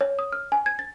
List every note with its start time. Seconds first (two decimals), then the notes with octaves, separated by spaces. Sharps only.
0.01 C#5
0.19 D#6
0.33 F6
0.52 G#5
0.66 G#6
0.79 A6